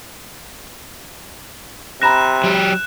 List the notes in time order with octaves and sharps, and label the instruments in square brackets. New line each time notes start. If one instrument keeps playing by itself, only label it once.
[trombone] C3 [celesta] A#5 B5 A#6 [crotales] F#6 E7
[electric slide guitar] F#3 G4